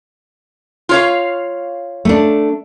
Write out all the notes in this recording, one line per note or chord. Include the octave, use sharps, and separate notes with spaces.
F4 C#5 F5
A3 D4